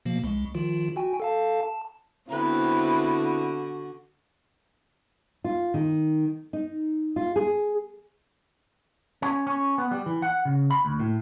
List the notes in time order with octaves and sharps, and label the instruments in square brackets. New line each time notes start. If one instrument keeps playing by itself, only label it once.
[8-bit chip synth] B2 F3 A#3
C2 G#3
D#3 F3 F4
F#4 G5 G#5
A4 F5 A5
A5
[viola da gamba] D3 F#4 [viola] B3 B4 [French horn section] C4 E4
[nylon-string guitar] F4
D#3
D#4
F4
G#4
[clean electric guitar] C#4
C#4
B3
G3
E3
F#5
C#3
B5
D2
A2